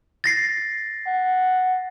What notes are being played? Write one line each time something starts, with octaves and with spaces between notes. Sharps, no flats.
A6 A#6 C7
F#5